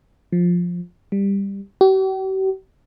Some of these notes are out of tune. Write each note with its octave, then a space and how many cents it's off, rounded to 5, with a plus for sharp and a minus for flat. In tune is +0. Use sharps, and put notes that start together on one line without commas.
F3 +10
G3 +15
G4 -45